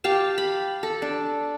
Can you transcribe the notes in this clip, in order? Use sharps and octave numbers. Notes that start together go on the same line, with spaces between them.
G4 F5 A5
B5
A4
D4